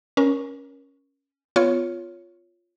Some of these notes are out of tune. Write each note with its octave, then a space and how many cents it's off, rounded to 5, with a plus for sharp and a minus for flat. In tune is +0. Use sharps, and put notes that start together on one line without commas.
C#4 +0 A#4 +25
B3 +25 F4 +0 C#5 +0